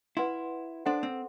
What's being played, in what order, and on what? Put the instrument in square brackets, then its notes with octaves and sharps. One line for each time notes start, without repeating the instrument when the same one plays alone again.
[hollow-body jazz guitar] E4 [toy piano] B4 F#5 C6
[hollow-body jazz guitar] D4 [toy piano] A4 C5 F#5 C6
[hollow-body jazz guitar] C4